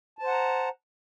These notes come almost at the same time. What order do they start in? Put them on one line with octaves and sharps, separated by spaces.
A5 C5 F#5 A#5